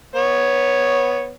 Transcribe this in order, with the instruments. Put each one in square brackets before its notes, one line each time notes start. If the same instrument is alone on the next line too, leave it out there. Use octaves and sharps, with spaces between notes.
[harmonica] B3 C#5